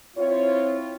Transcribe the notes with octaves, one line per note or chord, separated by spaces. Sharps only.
C4 E4 F4 C#5